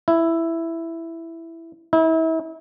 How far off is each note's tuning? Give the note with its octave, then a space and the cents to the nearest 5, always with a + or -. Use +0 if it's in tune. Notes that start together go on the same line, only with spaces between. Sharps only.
E4 +5
E4 -35